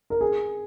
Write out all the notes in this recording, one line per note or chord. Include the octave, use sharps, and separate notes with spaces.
A#4
G#4